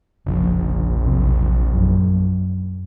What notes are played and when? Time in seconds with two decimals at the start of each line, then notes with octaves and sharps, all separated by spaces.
0.26 F1 A#1 C#3 F3
0.58 A#1
1.06 E1 B1 C3
1.75 F#2